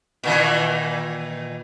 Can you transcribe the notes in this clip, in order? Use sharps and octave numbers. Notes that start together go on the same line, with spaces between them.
A#2 D#3 E3